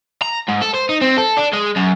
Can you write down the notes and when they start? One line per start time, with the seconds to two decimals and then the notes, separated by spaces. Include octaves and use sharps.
0.22 A#5
0.48 G#2
0.62 A4
0.74 C5
0.89 D#4
1.01 C4
1.18 A4
1.37 D4
1.53 G#3
1.76 F#2